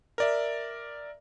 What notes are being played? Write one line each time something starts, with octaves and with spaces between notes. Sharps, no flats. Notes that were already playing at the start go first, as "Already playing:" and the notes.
A#4 D5 E5